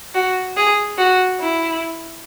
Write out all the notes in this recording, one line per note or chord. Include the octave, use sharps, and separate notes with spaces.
F#4
G#4
F#4
E4